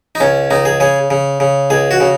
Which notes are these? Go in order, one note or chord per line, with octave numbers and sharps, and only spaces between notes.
D#4
C#2 C#4
C#2 D#4
G#4
C#3 G#4
C#3
C#3
C#2 G#4
F#4
C#3